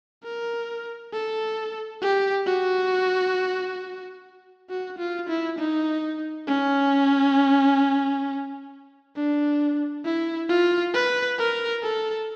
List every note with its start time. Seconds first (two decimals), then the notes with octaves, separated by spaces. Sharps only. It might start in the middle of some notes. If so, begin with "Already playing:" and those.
0.24 A#4
1.13 A4
2.01 G4
2.46 F#4
4.69 F#4
4.98 F4
5.29 E4
5.58 D#4
6.47 C#4
9.16 D4
10.05 E4
10.49 F4
10.94 B4
11.38 A#4
11.83 A4